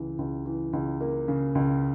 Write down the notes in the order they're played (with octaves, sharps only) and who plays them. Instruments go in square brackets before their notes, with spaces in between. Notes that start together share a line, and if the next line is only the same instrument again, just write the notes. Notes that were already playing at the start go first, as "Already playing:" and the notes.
Already playing: [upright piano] C#2 E3
C#2
E3
C#2
A#3
C#3
C#2